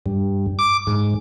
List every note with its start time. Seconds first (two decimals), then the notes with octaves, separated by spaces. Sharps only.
0.06 G2
0.59 D6
0.87 G#2